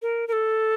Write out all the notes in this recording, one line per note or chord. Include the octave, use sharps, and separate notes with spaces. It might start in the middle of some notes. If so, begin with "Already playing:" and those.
A#4
A#4
A4